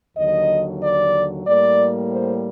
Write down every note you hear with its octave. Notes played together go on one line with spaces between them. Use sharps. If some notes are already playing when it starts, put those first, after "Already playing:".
D#2 D3 F#3 D#5
D5
A2 G3 A#3 D5
C5